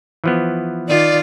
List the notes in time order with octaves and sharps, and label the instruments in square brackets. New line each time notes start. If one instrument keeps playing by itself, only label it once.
[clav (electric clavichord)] E3 F3 B3
[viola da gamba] D#3 F4 [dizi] D5